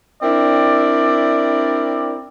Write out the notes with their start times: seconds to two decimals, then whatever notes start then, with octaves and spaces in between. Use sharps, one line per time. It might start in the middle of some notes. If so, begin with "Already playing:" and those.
0.23 C4 D4 E4 A#4 D5